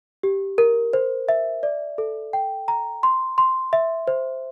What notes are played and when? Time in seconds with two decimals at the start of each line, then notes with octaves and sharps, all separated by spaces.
0.23 G4
0.58 A#4
0.93 C5
1.29 E5
1.63 D5
1.98 A4
2.33 G5
2.68 A#5
3.03 C6
3.38 C6
3.73 E5
4.07 C5